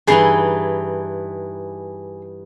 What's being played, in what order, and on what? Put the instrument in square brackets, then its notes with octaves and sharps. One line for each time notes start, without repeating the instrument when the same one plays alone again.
[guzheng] G2 E3 D#4 [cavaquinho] G#4 G#5